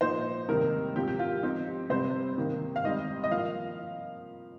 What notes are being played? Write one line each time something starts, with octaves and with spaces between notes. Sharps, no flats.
A#2 F3 D#4 C5
C3 D#3 G3 A#3 D#4 A#4
C3 F3 C4 G4
G4
F4
F3 C4 D#4 G4
C3 G3 C4 C5
C3 D#3 A#3
F5
D#3 G3 C4 D#5
D#5
F3 A#3 F5